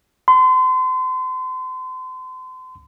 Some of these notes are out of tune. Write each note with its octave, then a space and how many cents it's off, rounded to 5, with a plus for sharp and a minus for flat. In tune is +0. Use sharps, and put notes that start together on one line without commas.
C6 -35